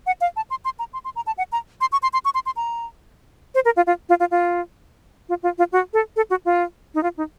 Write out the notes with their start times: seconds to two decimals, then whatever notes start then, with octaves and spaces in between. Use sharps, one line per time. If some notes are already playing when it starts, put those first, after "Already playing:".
0.06 F#5
0.21 F5
0.36 A5
0.50 C6
0.65 C6
0.79 A#5
0.93 C6
1.05 C6
1.16 A#5
1.27 A5
1.38 F#5
1.52 A#5
1.81 C6
1.92 C#6
2.03 C6
2.13 C6
2.25 C#6
2.35 C6
2.46 C6
2.56 A#5
3.55 C5
3.65 A#4
3.76 F4
3.87 F4
4.09 F4
4.20 F4
4.31 F4
5.29 F4
5.43 F4
5.58 F4
5.72 F#4
5.93 A4
6.16 A4
6.30 F#4
6.45 F4
6.95 D#4
7.03 F4
7.17 D#4